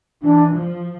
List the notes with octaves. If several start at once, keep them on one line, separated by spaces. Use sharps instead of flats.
E3 D4
F3